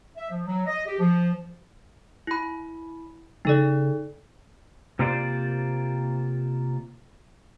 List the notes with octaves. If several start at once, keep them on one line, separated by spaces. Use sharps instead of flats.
E5
F3
F#3
D#5
G4
F3
E4 B5
C#3 D#4 A4 D5
C3 A#3 F4 C5 D5